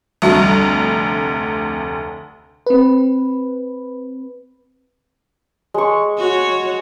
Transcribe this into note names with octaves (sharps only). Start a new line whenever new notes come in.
F1 D2 G3 F#4
C4 B4
G#3 C#6
F#4 C#5